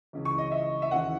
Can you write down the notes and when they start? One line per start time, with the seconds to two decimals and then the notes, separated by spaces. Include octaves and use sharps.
0.13 C#2 C#3 E3
0.25 C#6
0.38 D#5
0.51 E5
0.82 E5
0.91 D#2 C#3 E3 F#5